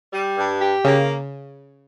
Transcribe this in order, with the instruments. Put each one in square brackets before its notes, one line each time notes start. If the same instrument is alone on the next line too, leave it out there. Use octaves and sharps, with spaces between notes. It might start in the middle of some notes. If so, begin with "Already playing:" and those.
[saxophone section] G3
G2
G4
[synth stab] C#3 [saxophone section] A#3